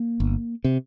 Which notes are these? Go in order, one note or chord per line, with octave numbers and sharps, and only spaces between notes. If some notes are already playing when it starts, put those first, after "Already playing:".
Already playing: A#3
G1
C3